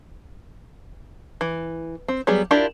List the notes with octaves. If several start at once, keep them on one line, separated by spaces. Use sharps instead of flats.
E3
C4
F#3 G3 B3 G#4
D4 E4 F4 G4 A#4